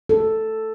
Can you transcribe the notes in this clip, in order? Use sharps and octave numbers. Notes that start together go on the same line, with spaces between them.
A4